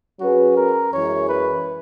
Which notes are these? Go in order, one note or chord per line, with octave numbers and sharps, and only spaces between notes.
F#3 C#4 F#4 G#4 B4
A#4
F#2 E3 G#3 C#5
B4